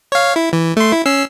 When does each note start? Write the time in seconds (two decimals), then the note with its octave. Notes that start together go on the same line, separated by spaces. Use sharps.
0.12 C#5 F5
0.36 E4
0.53 E3
0.77 A3 C6
0.92 E4
1.06 C#4 E6 C7